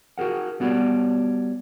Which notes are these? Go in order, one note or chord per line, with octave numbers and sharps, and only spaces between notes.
F#4 G#4 A#4 F#5
G3 B3 F#4 C#5 D5